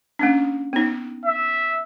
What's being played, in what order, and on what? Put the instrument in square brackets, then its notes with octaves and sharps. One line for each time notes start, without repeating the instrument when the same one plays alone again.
[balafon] A#3 C#4 D4
B3 D#4
[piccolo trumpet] E5